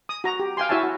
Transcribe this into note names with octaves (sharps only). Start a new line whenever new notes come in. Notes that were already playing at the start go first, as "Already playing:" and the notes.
D#6
F#4 A#5
G4
F5 G5 G#5 C6
E4 F#4 C#5 E5 G#5 A5
F#4